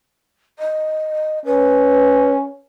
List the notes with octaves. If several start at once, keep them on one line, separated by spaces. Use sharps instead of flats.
D#5
C#4 B4